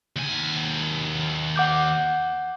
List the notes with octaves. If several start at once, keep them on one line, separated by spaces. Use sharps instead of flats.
D#2 G#5
F#5 D6 G6